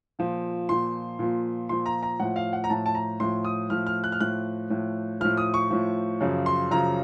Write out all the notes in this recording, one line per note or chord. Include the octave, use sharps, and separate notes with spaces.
A#2 F3
A#2 F3 C6
A#2 F3
A#2 F3 C6
A#5
A#5
A2 F3 F#5
F5
F#5
A#5
A2 F3 A5
A5
A#5
A2 F3 C6
D#6
A2 F3 F6
F6
F#6
F6
A2 F3 F#6
A2 F3
A2 F3 F6
D#6
C#6
A2 F3
F#2 C#3 F3
C6
F#2 C#3 F3 A#5